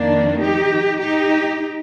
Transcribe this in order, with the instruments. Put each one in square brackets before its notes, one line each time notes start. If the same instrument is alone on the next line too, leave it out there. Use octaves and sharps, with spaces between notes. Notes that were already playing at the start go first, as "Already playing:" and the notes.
Already playing: [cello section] F2 D#3 A#3 D4
D#4 G4
D#4 G4